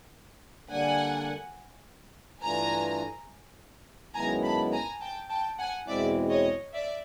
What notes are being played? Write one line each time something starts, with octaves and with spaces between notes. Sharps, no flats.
D3 G3 A#3 D4 F#5 G#5
G2 E3 A3 D4 F4 G#5 A#5
F#2 D#3 G#3 B3 E4 G#5 A#5
A5 B5
G#5 A#5
G5 A5
G5 A5
F#5 G#5
E2 B2 G#3 C4 E4 D5 E5
C#5 D#5
D5 E5